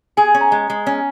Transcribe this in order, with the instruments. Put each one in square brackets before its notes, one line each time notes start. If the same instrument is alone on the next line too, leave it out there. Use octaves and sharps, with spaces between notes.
[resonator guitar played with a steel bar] G#4 [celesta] G#5
[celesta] G#5
[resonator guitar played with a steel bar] C#4
[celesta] A#5
[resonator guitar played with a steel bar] G#3 [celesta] A#5
[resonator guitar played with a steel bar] G#3
C#4